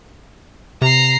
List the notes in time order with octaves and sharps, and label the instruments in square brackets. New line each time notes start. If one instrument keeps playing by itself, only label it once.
[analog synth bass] C3 [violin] A#5 C7